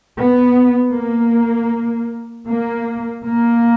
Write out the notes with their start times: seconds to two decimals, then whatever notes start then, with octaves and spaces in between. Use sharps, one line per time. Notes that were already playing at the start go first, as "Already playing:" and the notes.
0.15 B3
0.93 A#3
2.47 A#3
3.25 A#3